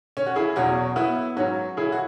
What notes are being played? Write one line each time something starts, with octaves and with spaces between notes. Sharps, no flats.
C#4
F#4
E4 G#4
E2 B2 F#3 C#4 F#4
B3 E4
G#2 F#3 C#4 F#4
E4 G#4
F#4